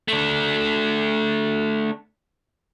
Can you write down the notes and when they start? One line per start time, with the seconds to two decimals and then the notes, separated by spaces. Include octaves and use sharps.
0.08 A3 D4